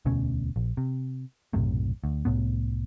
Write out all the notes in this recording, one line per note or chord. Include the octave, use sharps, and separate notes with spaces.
E1 D2 B2 C#4
A#1
C3
B1 F#2 A2 C3
D2
C2 F#2 A2 B3